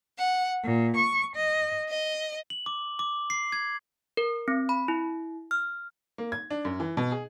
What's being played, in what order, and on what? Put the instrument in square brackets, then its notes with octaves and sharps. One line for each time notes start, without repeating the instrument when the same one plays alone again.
[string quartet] F#5
A#2
C#6
D#5
D#5
[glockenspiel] F#7
D6
D6
C7
G#6
[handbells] A#4
C4
B5
E4
F6
[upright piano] A#3
G#6
D4
F#2
E3
B2
G#4